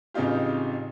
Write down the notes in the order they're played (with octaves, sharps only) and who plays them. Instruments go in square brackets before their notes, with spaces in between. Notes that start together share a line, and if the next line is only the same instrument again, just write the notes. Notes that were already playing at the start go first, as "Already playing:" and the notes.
[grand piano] A1 C#3 C4 D#4 F4 G4